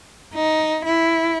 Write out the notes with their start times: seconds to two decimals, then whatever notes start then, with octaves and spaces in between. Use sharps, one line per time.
0.35 D#4
0.85 E4